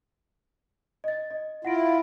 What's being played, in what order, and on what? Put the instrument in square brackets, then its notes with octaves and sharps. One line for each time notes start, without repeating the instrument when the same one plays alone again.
[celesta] D#5 A6
D#5
[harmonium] E4 F4 [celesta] F#5 A#6 D7